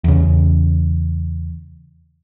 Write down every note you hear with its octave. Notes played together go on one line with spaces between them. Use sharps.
E2 C#3